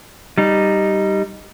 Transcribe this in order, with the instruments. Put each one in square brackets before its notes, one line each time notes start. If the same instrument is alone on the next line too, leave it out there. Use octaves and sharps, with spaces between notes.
[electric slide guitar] G3 D#4